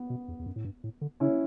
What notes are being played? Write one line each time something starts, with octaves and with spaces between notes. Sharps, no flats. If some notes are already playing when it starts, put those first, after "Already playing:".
Already playing: B3
B2
E2
E2
F#2
A2
G2
A2
D3
C#3 C#4 E4